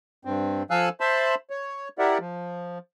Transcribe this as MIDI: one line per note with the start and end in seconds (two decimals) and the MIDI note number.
0.25 0.63 43
0.25 0.63 60
0.70 0.89 53
0.70 0.89 69
0.70 0.89 77
0.70 0.89 80
0.70 0.89 88
0.70 0.89 90
1.00 1.35 72
1.00 1.35 76
1.00 1.35 81
1.00 1.35 83
1.00 1.35 84
1.50 1.88 73
1.98 2.18 64
1.98 2.18 67
1.98 2.18 70
1.98 2.18 74
1.98 2.18 76
1.98 2.18 78
2.20 2.78 53